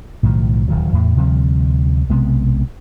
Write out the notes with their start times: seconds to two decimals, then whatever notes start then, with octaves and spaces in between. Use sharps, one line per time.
0.23 B1 A2 D#3 F3
0.68 D1 E2 D#3 F#3
0.93 E2 A2
1.17 D2 C3 F3 G3
2.09 B1 C3 G#3 B3